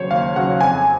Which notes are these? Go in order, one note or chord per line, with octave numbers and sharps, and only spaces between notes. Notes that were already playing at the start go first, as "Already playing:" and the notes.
Already playing: D#2 C#3 F#3 C5 C#5
D#2 F5
C#3 F#3 F#5
F2 G#5